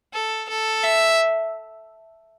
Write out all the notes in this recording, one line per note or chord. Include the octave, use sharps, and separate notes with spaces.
A4
A4
E5